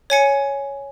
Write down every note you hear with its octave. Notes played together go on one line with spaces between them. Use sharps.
C#5 G#5 C#7